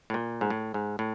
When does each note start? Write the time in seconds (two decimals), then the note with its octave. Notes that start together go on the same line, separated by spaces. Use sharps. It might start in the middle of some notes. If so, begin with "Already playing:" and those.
0.10 A2
0.14 A#2
0.41 G#2
0.50 A2
0.74 G#2
0.99 A2